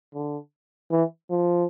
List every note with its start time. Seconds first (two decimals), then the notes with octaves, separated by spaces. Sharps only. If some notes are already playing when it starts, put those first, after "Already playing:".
0.14 D3
0.91 E3
1.30 F3